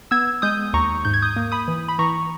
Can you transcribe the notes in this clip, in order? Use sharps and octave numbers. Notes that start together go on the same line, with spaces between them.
B3 E6 G#6
G#3 D#6 G6
D#2 A#5 C#6
G#2 G6
G#6
D#6 G6
A#3
B5 D#6
E3
B5
E3 A#5 C#6